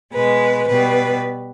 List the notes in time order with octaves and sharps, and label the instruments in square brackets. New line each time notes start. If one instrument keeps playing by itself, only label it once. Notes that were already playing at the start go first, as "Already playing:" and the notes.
[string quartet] B2 G#3 B4
B2 G3 B4